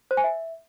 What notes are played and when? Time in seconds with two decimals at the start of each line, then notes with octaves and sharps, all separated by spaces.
0.11 C5
0.17 G#5
0.24 E5